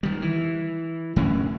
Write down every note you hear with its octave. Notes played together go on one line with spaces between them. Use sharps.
D#3 G3
E3
F2 A2 D3 C#4